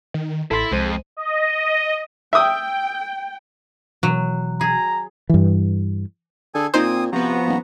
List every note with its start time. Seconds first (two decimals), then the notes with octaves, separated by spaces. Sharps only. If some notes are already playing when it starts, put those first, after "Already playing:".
0.14 D#3
0.51 A1 E4 A4 B5 C6 A6
0.72 C2 F2 G#3 C5 D#7
1.17 D#5
2.33 E5 G5 D#6
4.03 B2 E3 F#3 F#6
4.61 G#4 A#5
5.29 G2 E3
6.54 D3 G#4 A4 G#5
6.74 A#2 C4 D#4 C5 G#5 D#6
7.12 C3 F3 B3 F#4 A#5
7.47 D#1